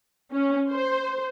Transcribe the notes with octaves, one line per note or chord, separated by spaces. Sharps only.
C#4
C5